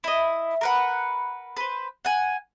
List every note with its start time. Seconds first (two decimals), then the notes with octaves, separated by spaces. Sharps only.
0.04 E4 D#5
0.61 A#4 B4 F#5
1.57 B4 C5
2.05 F#5 G#5